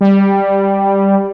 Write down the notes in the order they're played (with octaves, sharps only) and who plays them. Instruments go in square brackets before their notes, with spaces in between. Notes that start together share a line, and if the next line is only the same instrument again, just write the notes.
[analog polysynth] G3